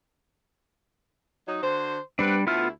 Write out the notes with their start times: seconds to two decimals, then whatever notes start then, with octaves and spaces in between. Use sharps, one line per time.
1.47 F#3 D#4
1.62 D3 F#4 C5
2.19 G3 B3 C4 D4 B4
2.47 D2 A3 B3 E4 F4 F6